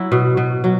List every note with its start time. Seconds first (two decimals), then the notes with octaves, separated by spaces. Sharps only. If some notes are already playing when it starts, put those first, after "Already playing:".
Already playing: F#3 E4
0.12 B2
0.37 B2
0.64 F#3